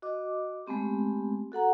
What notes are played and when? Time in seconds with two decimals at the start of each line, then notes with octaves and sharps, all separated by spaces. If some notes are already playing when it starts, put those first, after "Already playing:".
0.02 F#4 D#5 D6
0.67 G#3 A3 B3 C4 G4
1.52 F#4 A4 F#5 A#5